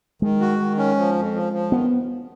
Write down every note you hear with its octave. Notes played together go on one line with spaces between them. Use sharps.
D#3 G#3
F#4
D#3
C#4
F3
F2
F3
F3
D#3 B3